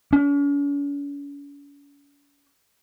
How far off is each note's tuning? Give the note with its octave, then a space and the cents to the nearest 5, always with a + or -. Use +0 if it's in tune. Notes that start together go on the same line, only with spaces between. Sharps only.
C#4 +45